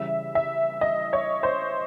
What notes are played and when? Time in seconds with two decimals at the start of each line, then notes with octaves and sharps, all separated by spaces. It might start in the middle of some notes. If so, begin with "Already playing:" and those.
Already playing: C#3 E3 G3 E5
0.35 E5
0.81 D#5
1.13 C#5
1.43 C5